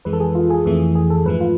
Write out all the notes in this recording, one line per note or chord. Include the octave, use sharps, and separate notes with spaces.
F2 E3 G#3 B4
A4
G#4
F4
G#4
F2 E3 A3
G#4
A4
G#2 F3 A3 B4
F4